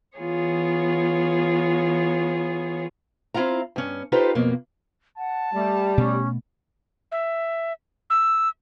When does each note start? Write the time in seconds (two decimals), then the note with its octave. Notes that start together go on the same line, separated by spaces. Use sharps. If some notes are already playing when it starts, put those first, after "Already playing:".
0.18 E3 B3 F4 G#4 C#5
3.34 C4 E4 F4 F5 A#5
3.76 G2 C#4
4.12 D#4 F4 G4 A4 B4 C5
4.35 F2 B2 A#3
5.18 F#5 A5
5.54 G3 A3
5.98 B2 A3 C#4
7.12 E5
8.10 E6